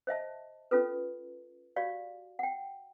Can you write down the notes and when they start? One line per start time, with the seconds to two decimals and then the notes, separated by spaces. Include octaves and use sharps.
0.07 C5 D#5 E5 A5
0.71 C#4 F4 A4 B4
1.76 F#4 G4 D5 F5
2.39 F#5 G5